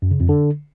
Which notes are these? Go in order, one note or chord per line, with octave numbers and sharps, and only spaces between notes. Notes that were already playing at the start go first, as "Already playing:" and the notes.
F#2
C#3
F2
D3